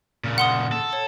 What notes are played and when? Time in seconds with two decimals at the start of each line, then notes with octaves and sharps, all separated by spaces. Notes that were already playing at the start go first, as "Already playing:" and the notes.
0.24 A#2 C#3
0.38 F#5 C6 D#6
0.72 A4
0.93 C#5